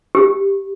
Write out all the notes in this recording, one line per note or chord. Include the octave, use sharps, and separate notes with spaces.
G4